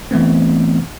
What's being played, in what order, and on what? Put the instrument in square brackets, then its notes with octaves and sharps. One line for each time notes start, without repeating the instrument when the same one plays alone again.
[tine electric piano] E3 A3 B3 C4